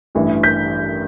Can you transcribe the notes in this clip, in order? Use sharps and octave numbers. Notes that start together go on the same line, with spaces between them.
A1 G2 E3
G6 B6